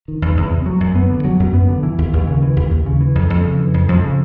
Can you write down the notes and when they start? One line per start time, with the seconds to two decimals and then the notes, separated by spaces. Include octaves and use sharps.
0.08 D#3
0.22 E2
0.37 E2
0.52 C3
0.66 F#3
0.80 F#2
0.95 B3
1.10 D3
1.25 F#3
1.40 F#2
1.54 B3
1.69 D3
1.83 E3
1.98 D#2
2.13 D#2
2.27 C#3
2.42 E3
2.56 D#2
2.71 D#2
2.86 C#3
3.01 E3
3.15 F2
3.30 F2
3.45 C#3
3.59 E3
3.74 F2
3.88 F2
4.03 C#3